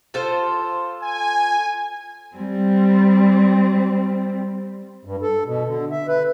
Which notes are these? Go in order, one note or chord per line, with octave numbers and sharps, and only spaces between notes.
F4 A4 C5
G#5
G3 C4
G2
A4
B2
D3
E5
B4